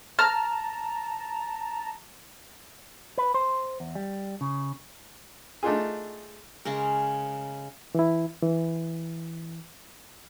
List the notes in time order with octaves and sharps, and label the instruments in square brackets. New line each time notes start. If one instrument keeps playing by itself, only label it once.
[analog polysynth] A5 A#5 [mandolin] F6
[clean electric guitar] B4
C5
E2
G3
C#3
[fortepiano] A3 D4 D#4 F4 G#4
[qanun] C#3 G#3 C#4 A#4
[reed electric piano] E3 E4
E3